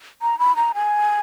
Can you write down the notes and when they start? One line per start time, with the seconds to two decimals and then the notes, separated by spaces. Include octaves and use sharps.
0.22 A#5
0.39 B5
0.56 A#5
0.75 G#5